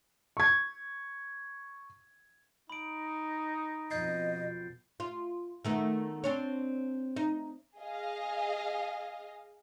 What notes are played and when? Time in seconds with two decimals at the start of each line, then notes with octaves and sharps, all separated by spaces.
0.37 C#6 G#6
2.70 D#4 B5 D7
3.91 F2 B2 F3 D#5 G6 A6 C7
5.00 F4
5.65 D#3 A3 B3
6.24 C4 D4 C#5
7.16 D#4
7.78 G#4 D#5 F5